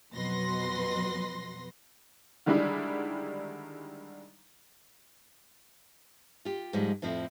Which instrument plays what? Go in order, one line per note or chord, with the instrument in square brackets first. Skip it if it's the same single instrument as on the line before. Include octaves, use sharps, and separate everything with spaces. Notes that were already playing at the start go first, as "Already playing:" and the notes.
[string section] F2 B2 F#3 B4 C6 A#6
[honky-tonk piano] D3 D#3 G3 G#3 D4 E4
[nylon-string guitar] F4 G4
G#2 F3 G3 G#3
F2 A2 F3 C4 E4